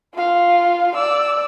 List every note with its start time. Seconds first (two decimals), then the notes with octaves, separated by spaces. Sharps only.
0.14 F4 F5
0.95 D5 E6